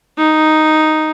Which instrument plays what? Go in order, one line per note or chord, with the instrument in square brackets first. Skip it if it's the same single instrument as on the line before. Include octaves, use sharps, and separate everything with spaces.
[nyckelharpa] D#4